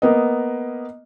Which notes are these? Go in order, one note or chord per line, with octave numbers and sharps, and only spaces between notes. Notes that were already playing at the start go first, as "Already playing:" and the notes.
A#3 B3 D#5